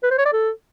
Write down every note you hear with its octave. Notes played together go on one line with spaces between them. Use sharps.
B4
C5
C#5
D5
A4